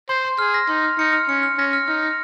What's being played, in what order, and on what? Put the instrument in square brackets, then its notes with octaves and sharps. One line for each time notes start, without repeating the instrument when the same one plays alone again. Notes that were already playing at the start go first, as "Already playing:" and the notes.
[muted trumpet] C5 [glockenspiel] C6
[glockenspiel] C6
[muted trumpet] G#4 [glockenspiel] F6
[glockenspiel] A#6
[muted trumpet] D#4 [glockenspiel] C6
[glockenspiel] F6
[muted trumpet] D#4 [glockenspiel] C#7
[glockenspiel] F6
[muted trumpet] C#4 [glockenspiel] C#7
[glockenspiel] F6
[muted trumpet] C#4 [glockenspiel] A#6
[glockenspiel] F6
[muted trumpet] D#4 [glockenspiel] F6
[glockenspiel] A#6